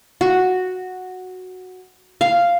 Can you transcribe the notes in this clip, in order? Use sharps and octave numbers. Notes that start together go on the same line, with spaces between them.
F#4
F5